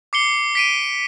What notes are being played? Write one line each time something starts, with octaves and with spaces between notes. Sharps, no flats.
D6 C7 C#7 G7
B6 D7 D#7